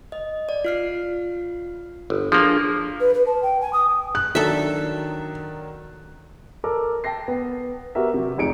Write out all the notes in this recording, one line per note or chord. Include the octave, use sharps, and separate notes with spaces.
D#5
D5
F4 F6 C7
G1
F3 A#3 D4 F4 G#4
B4
B4
A5
G5
G#5
D#6
F#6
D#3 F#3 D4 A4 E5
A4 A#4 D6
G5 A5 A#6 C7
B3
B3 F#4 G4 A#4 E5
C3 F#3
F1 D#4 G#4 C#7 D7